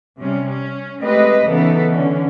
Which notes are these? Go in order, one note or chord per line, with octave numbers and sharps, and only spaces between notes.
C3 G3 C#4
C#4
G#3 A3 C4 G4 B4 D#5
C#3 E3 F#3 B3 D#4 A4
D3 E3 C#4